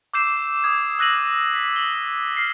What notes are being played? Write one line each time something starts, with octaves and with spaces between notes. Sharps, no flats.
D6 E6 G6 C7 E7
D#6 G#6
E6 F#6 A#6 D#7 F#7
B6
F#7 G7
F6 C7